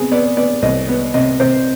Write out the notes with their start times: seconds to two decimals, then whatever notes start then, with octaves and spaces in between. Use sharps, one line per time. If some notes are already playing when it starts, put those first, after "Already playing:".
Already playing: C3 B3 G#4
0.11 B3 D5
0.37 B3 D5
0.62 C2 D#5
0.89 B3
1.14 C3 D#5
1.40 C3 C5